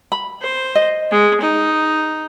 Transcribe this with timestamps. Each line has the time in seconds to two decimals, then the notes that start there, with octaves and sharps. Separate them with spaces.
0.12 B5
0.42 C5
0.75 D#5
1.11 G#3
1.41 D#4